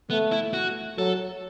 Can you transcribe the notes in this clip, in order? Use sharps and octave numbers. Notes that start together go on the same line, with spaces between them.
A3 B3
E4
F#4
F#3 A4